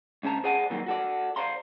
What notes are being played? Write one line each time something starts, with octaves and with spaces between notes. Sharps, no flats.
C#2 C#4 C5 A5 A#5
G#4 C5 D5 F#5 G#5 A5
D#3 E3 F#3 G3 A#3 C4
F#4 A4 D5
C5 D5 F5 A#5 C6